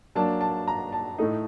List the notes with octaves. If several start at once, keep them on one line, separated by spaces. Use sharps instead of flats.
F#3 A#3 D4 A5
A5
A#5
A5
A2 A3 D#4